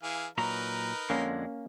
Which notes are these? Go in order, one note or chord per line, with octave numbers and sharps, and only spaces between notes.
E3 G#4 F5
A#2 F#3 D#4 A#4 B4 A#5
F2 D3 G#3 A#3 C#4